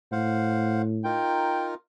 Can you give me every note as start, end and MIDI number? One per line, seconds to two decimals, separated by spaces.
0.12 1.18 45
0.12 0.82 72
0.12 0.82 77
0.12 0.82 78
1.04 1.74 63
1.04 1.74 65
1.04 1.74 70
1.04 1.70 79